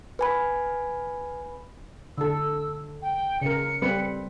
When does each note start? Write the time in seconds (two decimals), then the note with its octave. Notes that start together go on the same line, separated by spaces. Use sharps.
0.19 B4 G#5 B5
2.18 D3 A4 E6
3.02 G5
3.42 C#3 A#4 C#7
3.82 G3 C4 B4